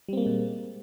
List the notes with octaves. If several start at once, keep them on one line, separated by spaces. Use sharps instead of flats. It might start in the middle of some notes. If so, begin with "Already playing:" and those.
A#2 G3 G#3 A#3 C4